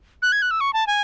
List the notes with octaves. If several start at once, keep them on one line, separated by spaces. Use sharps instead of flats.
F#6
G#6
F#6
E6
C#6
A5
G#5